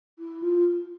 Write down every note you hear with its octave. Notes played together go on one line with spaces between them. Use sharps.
E4
F4